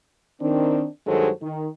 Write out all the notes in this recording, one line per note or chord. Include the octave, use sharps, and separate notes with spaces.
D#3 C4 D4
G2 D#3 F#3 G#3 A4 C5
D#3